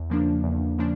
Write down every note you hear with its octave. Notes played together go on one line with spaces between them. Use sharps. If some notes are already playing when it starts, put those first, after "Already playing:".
Already playing: E2
C#3 F3 A#3 D4
E2
C#3 F3 A#3 D4